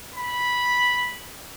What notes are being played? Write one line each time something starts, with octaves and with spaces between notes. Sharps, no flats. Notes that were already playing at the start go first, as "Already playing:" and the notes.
B5